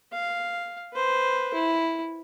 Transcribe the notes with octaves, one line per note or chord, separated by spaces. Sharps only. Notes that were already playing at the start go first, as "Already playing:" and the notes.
F5
B4 C5
E4